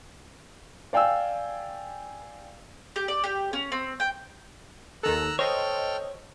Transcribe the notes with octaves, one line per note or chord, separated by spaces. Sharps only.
D5 F5 G5 G#5 E6
G4
D5
G4
C#4
C4
G5
D#2 D#3 A4 A#5 E6 F#6
A4 C5 C#5 D#5 G5 F6